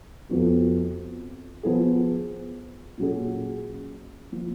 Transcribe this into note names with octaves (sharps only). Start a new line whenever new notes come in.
F2 F3 B3 F#4
F3 B3 F4 G#4
A#2 F#3 C#4 G#4
F3 A#3